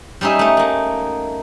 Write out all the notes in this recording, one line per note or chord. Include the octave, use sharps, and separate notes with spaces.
G3 C#4 D#4 G#4 E5
A3 D#4
A3 A#3